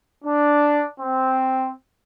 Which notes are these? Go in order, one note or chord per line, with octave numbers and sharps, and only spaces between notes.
D4
C4